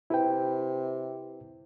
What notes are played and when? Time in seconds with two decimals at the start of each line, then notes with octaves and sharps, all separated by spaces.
0.10 C3 E4 B4 G5